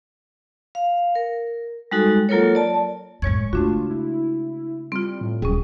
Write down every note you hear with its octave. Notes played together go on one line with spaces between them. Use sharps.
F5
A#4
G3 G#3 D#4 F#4 A4
F#3 A#3 F4 A4 A#4 C#5
D5 A5
F#2 A2 G#3 C#5 C#6 G#6
C#3 A3 D4 F4 F#4
E4
G3 C4 F4
A2
D#1 F#3 G3 C#4 G#4